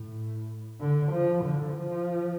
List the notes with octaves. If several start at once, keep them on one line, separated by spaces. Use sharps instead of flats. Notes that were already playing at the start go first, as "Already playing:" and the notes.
Already playing: A2
D3
F3
D3
F3